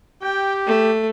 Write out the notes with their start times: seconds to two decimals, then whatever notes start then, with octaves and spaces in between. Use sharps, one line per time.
0.22 G4 G5
0.66 A3